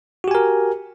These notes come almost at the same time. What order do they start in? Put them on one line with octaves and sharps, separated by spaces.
F#4 G4 G#5 A#4